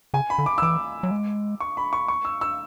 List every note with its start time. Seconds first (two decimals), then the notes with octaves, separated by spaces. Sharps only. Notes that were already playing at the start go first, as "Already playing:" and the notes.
0.14 C#3 G#5
0.30 B5
0.38 D3
0.46 D6
0.58 E6
0.62 E3 D6
1.03 F#3
1.11 G#3
1.60 C#6
1.77 B5
1.93 C#6
2.08 C#6
2.25 E6
2.41 E6